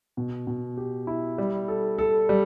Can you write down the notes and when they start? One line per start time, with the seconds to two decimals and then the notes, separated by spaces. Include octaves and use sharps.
0.17 B2
0.47 B2
0.77 G4
1.07 E4
1.38 G3
1.68 A4
1.98 A4
2.29 G3